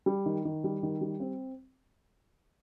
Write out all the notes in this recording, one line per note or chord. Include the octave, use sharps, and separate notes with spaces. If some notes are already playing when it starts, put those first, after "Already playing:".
G3
D#3
D#3
G3
D#3
G3
C4